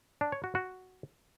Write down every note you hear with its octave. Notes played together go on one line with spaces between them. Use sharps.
D4
C#5
F#4
F#4